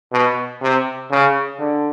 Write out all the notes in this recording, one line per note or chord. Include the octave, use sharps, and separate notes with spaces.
B2
C3
C#3
D3